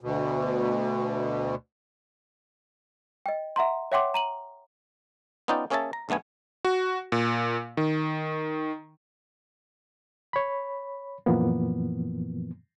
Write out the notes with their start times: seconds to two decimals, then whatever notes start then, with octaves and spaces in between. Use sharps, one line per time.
0.01 D2 B2
3.26 D#5 G5
3.56 E5 F#5 A#5 C6
3.92 C#5 E5 F#5 G5 C6 D6
4.14 A#5 D#7 F#7
5.48 B3 C#4 D#4 F4 D5 G5
5.70 A#3 C#4 G#4 C#5 E5 A5
5.93 A#5
6.09 B1 D3 A3 B3 G#5
6.65 F#4
7.12 A#2
7.77 D#3
10.33 C#5 B5
11.26 F#2 A#2 E3 F3 A#3 B3